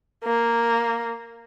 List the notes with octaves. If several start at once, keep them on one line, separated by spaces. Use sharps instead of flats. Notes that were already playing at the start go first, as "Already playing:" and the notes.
A#3